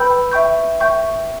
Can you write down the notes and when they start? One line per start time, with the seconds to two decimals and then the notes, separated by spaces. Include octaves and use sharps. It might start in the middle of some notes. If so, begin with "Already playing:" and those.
Already playing: B4 G5 B5 E6 G6
0.32 E5 G5 C#6 G6
0.80 E5 G5 C#6 G6